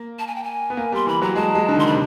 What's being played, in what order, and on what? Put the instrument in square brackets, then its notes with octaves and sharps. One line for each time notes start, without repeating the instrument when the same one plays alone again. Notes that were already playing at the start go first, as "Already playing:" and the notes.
Already playing: [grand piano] A#3
[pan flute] A5
G#5
G5
G#5
[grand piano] B3
A#3
[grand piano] G3 [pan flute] C6
[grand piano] E3 [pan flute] B5
[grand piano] F#3 [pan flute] A#5
[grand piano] G#3 [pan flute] A5
[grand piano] G#3
D3
D#3
[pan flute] C6
B5
[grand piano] C3